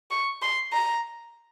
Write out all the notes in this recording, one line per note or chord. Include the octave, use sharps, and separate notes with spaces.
C#6
C6
A#5